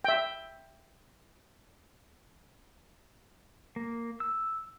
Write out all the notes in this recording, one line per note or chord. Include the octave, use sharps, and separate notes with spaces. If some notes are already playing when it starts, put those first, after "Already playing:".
E5 G5
A#3
E6